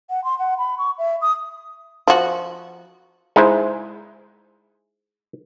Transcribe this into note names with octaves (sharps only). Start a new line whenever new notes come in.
F#5
C6
F#5
B5
C#6
E5
D#6
F3 F#4
G#3 D#4 E4 C5